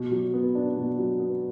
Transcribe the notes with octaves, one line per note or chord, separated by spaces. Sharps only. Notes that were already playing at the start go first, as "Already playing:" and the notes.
Already playing: B2
F#3
B3
D4
B2
F#3
B3